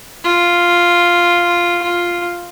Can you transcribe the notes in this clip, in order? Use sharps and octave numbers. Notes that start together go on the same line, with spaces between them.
F4
F4